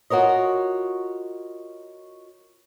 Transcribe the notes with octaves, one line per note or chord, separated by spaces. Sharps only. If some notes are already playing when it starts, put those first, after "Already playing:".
F4 F#4 A#4 C#5 D#5